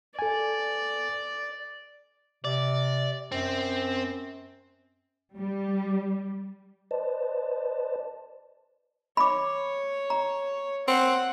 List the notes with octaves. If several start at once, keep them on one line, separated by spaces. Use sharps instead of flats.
A4 D5 G#5
C3 D5
F#2 C4
G3
B4 C5 D5 D#5 A5
C#5 B5 D6
A#5
C4 F#5